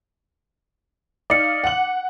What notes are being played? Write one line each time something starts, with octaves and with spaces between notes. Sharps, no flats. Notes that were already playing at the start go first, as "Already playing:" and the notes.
D#4 D5 F5 D6 C#7
F#5 F#7